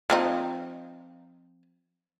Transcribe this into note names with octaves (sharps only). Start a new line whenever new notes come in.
F3 C4 D#4